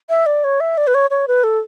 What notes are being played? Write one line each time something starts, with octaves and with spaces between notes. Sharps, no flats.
E5
D5
C#5
E5
D5
B4
C#5
C#5
B4
A4